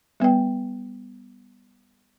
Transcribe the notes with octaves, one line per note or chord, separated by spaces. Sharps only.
G3 B3 B4 G5